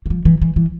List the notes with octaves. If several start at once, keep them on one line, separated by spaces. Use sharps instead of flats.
E3
F3
E3
E3
E3